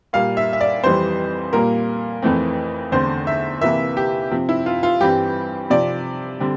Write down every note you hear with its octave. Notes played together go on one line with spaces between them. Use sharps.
A#2 G3 A#3 F5
E5
E5
D5
F2 E3 G3 C4 C5
A#2 G3 A#3 A#4
F2 E3 A3 C4
E2 D3 A3 C4 C5
E5
C3 E3 A#3 E5
G4
C3 F3 C4
E4
F4
F4
G2 E3 G3 C4 G4
C3 F3 C4 D5
D3 G3 C4